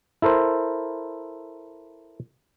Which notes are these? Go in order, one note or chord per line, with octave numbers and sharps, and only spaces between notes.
E4 A4 A#4 C5